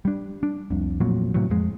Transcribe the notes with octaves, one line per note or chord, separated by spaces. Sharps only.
G3 D4
D4
F1 C2
A1 F2 A#2 F#3
A2 C3 E3 F#3
F2 G#3